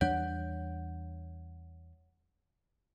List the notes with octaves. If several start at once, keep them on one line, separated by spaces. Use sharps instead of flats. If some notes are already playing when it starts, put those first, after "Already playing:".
E2 G3 D4 C#5 F#5 G6